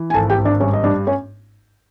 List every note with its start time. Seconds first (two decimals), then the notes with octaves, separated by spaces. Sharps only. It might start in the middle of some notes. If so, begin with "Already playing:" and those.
Already playing: E3
0.10 G#5
0.14 G#1 A4 A5
0.30 G4 G5
0.38 G#1
0.45 D4 D5
0.60 G2 C#4 C#5
0.73 D#5
0.84 G2 D4 D5
1.07 C#4 C#5